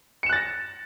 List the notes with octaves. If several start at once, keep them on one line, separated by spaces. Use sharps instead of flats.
F#6 A6 A#6 C#7 E7